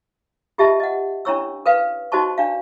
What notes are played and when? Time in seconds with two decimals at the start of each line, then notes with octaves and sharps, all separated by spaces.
0.58 F4 G4 D#5 E5 A5
0.80 D#5 F#5
1.25 C#4 D4 E4 C#5 C#6 E6
1.66 A#4 B4 F5
2.12 D#4 F#4 C5 D#5 A5 C#6
2.38 D4 D5 F5